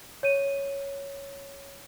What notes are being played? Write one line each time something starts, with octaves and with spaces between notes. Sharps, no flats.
C#5 D#7